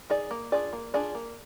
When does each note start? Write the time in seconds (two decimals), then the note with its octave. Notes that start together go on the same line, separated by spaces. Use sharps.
0.10 D#4 G#4 D5
0.31 A#3
0.52 D4 F4 G#4 D5
0.73 A#3
0.94 D4 F4 G#4 D5
1.15 A#3